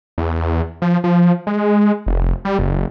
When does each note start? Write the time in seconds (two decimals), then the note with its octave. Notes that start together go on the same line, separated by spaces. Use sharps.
0.18 E2
0.82 F3
1.04 F3
1.47 G#3
2.06 F1
2.45 G3
2.59 F#1